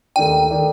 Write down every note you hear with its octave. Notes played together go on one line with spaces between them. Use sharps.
D#2 D#3 A3 D4 G5
D#3 A3 D4